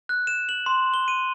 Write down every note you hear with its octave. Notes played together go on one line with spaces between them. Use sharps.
F#6
E7
F#7
C6
G7
D#7